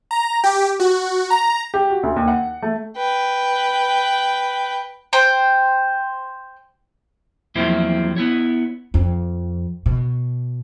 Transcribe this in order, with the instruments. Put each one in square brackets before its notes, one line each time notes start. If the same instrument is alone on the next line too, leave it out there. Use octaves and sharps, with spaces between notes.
[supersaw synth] A#5
G4
F#4
A#5
[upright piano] G4
F#4
D2
D#2
F#5
A3
[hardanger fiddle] B4 G5
[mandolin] C5 G5
[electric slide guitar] E2 F3 F#3 A#3 C4 E4
B3 E4 C#5
[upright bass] F2
B2